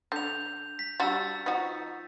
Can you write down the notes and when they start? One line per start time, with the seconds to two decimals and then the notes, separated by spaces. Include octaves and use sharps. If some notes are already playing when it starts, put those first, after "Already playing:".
0.12 D3 G6 F7
0.79 B6
1.00 G3 D4 F#4 E6 A6
1.46 F3 D#4 F#4